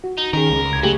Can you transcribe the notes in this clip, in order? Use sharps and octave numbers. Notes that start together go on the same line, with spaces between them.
F#4
D#4
D#3 C#4 G#4 A#4
C#2
C2 G#6
F#3 A3 G4 G#4